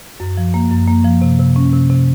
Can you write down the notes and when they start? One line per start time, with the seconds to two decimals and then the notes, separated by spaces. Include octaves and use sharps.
0.20 F#2
0.37 F3
0.54 A#3
0.71 F#2
0.88 A#3
1.05 F3
1.22 C3
1.39 C3
1.56 C#4
1.73 C3
1.90 C3